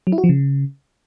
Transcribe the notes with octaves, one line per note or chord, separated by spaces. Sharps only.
F#3
E4
F#4
F3
C#3